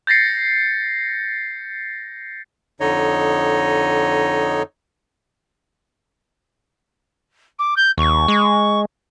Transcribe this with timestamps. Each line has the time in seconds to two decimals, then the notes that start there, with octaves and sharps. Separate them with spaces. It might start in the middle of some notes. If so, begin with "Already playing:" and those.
0.07 G6 A6 A#6 C7 C#7
2.80 F2 D3 D#4 C#5 D#5
7.59 D6
7.76 G6
7.98 D#2 C#6
8.28 G#3